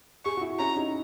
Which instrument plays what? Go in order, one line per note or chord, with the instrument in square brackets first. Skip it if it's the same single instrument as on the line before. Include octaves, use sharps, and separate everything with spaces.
[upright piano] G#4 [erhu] C#6
[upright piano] F#4
E4
[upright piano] C#4 [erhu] A#5
[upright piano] D#4